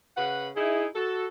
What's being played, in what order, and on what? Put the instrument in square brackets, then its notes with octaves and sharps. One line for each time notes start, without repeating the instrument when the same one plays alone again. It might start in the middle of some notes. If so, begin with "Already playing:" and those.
[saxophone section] C#3 B4 F#5
[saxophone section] D#4 E4 [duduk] G#4
[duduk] F#4 [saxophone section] A4